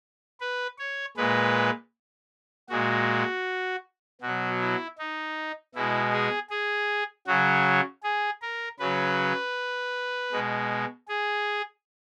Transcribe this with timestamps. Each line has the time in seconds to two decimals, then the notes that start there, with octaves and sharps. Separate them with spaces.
0.40 B4
0.78 C#5
1.17 A#2 G#3 B4
2.69 A#2 G#3 F#4
4.21 B2 F#3 F#4
4.60 E4
4.98 D#4
5.75 B2 G#3 E4
6.12 G#4
6.50 G#4
7.27 C#3 F#3 F#4
8.03 G#4
8.42 A#4
8.79 C#3 F#3 B4
10.32 B2 G#3
11.08 G#4